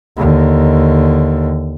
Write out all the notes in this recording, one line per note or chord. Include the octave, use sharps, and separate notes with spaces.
D#2 D3